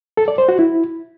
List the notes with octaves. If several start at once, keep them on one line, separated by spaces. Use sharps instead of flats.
A4
D5
C5
F#4
E4